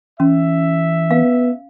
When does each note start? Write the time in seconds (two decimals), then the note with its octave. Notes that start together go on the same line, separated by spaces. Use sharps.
0.20 E3 C#4 E5
1.11 B3 F5